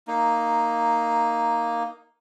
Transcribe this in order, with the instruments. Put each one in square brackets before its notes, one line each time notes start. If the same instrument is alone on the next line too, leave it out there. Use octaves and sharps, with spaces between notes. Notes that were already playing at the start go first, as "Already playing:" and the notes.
[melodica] A#3 D#4